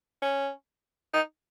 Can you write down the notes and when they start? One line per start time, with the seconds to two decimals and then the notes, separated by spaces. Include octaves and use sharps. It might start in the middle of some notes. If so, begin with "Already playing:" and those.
0.22 C#4
1.13 D#4